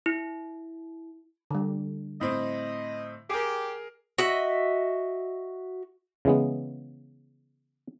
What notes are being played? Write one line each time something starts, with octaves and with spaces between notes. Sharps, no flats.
E4
D3 G3
A2 C4 D#5
G4 G#4 A#4
F#4 D#5 E5
C#3 E3 G#3 B3